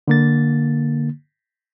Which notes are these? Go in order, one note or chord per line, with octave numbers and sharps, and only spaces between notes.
D3 A#3 A6